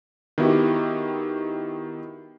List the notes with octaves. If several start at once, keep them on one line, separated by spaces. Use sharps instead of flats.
D#3 B3 E4 F#4 G4